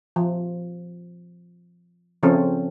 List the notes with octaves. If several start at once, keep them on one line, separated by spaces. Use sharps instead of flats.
F3
C#3 F3 C4 C#4 A4